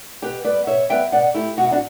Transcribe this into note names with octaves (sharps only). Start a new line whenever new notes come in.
B2 G4 B4
G3 B3 B4 D5
B2 C#5 E5
G3 B3 E5 G5
B2 D5 F#5
A3 E4 G4
B2 F#4
E4
D4 F#4